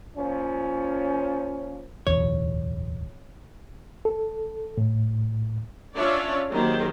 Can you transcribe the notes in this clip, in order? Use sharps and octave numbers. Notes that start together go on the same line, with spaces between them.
A#2 F3 C#4
D1 B1 E2 C#5
A4
A2
C#4 D4 F4 C#5 D5 E5
D#3 F#3 A#3 G4 G#4 C5